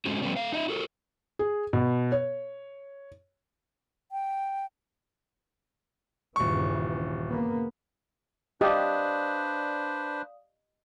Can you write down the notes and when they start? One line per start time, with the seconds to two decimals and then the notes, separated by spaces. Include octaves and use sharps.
0.06 G#3 A3 C4 C#4 F#4
0.22 F3 G3 A3 B3 C#4 D4
0.36 A3 F5
0.52 D#4 D#5 E5
0.68 F#4 A4 A#4
1.39 G#4
1.73 B2
2.12 C#5
4.12 G5
6.36 D#1 G2 C#3 E3 C#6
7.29 C#3 A#3 B3
8.61 D4 G4 B4 C5 D5 D#5 F5 D#6